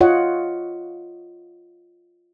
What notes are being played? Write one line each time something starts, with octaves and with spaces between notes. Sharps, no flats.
F4 C#5 D#5 F#5